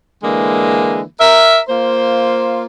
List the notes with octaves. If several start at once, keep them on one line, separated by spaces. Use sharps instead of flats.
D3 E3 G#3 A#3
A#4 E5
A#3 F4 C5